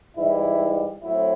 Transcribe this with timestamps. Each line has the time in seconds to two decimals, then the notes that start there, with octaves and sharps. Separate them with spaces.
0.16 G#2 E3 G3 E4
1.03 A2 F#3 A3 C4 E4